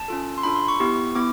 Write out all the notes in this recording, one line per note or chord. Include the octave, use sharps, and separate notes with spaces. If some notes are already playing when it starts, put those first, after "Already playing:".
Already playing: A5
C#4 F4 A4
C6
D4 F4 A4 B5
C6
C#6
B3 E4 G4 C#6
B3 E4 D6